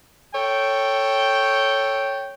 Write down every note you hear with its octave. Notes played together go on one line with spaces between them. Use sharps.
A4 C#5 G5